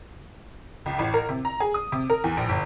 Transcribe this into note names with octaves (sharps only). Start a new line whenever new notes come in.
C#2
A1
A#4
C3
A#5
G#4
D#6
C3
A#4
E2
A#1
G1